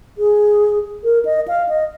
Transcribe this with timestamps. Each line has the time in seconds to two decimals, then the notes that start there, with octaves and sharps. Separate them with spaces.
0.18 G#4
1.04 A#4
1.25 D#5
1.48 F5
1.69 D#5